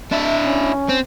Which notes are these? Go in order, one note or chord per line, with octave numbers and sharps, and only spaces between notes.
D4 E4 E5
C#4
C4